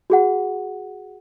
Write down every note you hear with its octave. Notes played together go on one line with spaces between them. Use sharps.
F#4 G#4 F#5